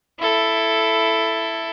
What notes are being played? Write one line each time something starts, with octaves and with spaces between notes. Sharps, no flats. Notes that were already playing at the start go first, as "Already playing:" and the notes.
E4 A4